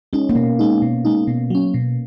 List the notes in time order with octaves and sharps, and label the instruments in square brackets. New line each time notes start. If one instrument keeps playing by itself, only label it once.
[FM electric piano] G#3 D#4 [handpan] C#4
[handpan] A#3
[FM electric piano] B2 [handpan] B3
[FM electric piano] G#3 D#4
B2
G#3 D#4
B2
F#3 C#4
B2